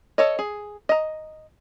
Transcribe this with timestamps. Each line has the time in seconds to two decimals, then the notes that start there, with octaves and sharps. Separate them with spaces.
0.18 A4 C#5 D#5
0.39 G#4
0.89 D#5 A#5